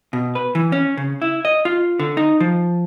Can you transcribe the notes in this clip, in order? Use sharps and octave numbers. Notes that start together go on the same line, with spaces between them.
B2
B4
E3
C#4
C#3
E4
D#5
F4
D3
D#4
F3